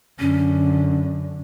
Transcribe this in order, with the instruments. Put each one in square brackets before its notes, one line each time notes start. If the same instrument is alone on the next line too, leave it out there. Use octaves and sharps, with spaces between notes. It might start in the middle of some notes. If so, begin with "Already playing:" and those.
[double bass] F#2 D3 [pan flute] C#4